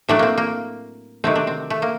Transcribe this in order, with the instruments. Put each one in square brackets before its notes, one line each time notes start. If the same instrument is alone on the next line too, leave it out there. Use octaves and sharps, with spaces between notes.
[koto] A2 F#3 A3 D4
A#3 C4
A#3
C3 D#3 F#3 A3 C4
D4
C4
A3
A#3